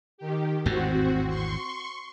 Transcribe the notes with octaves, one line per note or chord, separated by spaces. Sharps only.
D#3 G4
G#1 E2 A2 C4 F#4
C6 C#6